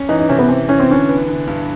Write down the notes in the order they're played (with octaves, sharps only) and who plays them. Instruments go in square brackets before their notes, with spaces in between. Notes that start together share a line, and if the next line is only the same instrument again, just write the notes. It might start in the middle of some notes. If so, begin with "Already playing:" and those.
Already playing: [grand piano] C#4
[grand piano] E3 [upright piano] D#4
[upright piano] D#4
[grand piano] C3 [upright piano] C#4
[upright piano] B3
[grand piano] E3 [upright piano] C4
[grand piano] E3 [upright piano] C#4
[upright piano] C4
[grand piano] D3 [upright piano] C#4
[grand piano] B3
D3
G2